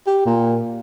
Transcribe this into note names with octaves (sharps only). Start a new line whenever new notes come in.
G4
A#2